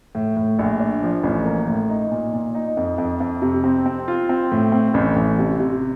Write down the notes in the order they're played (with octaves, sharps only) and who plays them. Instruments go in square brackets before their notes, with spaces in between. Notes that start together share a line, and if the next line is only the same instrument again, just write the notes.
[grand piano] A2
A2
A#1
D4
F3
A1
A#3
A2
D#4
A#2
A#2
D#4
F2
F2
F2
C3
C4
C4
F4
C4
A2
C4
A1
A1
C3
C3